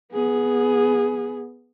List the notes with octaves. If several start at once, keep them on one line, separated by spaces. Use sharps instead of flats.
B3 G#4